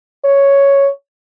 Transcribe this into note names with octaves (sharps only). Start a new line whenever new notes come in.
C#5